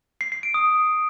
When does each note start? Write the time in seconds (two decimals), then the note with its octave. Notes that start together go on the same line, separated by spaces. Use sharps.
0.21 C7
0.32 C7
0.43 D7
0.54 D#6